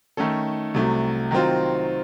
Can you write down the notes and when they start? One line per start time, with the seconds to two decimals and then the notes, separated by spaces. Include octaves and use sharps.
0.17 D#3 A3 C#4 A4
0.74 C2 C3 F#3 A3
1.31 D#3 F#3 C4 F4